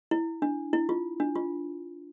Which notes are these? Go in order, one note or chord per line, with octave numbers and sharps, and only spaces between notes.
E4
D4
E4
F4
D4
F4